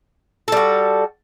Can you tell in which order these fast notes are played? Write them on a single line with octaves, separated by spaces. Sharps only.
A4 G3 F#4